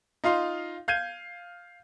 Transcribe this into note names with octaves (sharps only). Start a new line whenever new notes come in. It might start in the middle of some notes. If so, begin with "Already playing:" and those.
D#4 F4 F5 C6
F5 G6 G#6 D#7